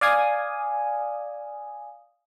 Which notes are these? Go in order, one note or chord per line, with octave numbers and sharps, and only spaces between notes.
D5 F5 G#5 D#6